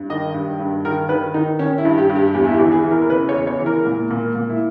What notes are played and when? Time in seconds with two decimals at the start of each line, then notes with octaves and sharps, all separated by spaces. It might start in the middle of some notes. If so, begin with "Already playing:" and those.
Already playing: G2
0.10 D#3 D#5
0.34 G2
0.60 G2
0.85 D#3 A#4
1.09 D#3 B4
1.34 D#3 D#4
1.59 D#3 C#4
1.78 E4
1.85 G2
1.98 G4
2.09 G2
2.16 G4
2.34 E2 G4
2.45 E4
2.54 G4
2.59 E3
2.72 G#4
2.84 E3
2.91 A#4
3.02 A#4
3.10 C#3 B4
3.29 C#5
3.35 E2
3.47 C#5
3.59 E3
3.66 A#4
3.85 A#2
4.11 A#2
4.35 A#2
4.50 E4